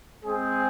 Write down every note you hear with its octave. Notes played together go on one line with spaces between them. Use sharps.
G#3 C4 G#4